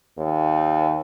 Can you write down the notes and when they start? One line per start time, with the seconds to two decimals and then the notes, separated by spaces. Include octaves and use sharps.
0.18 D#2